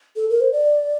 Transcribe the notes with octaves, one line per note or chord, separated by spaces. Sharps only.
A4
A#4
C5
D5